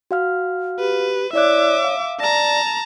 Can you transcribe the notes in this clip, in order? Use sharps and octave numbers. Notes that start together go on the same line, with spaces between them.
F#4 F5 F6
G4 B4
E4 C#5 D5 E5 D6 F#6
F5
D5 A5 A#5 A#6